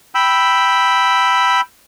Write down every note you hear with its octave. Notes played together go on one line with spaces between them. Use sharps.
G5 B5 E6